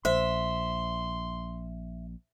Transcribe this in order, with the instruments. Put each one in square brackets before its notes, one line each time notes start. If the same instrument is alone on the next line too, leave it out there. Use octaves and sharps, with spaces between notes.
[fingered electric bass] A#1 [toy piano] C5 [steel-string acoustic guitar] E5 [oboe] C6